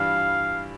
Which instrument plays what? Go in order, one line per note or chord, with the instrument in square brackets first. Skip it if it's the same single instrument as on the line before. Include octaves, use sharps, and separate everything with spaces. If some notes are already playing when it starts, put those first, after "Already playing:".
Already playing: [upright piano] G2 E3 G3 D4 F4 [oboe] F5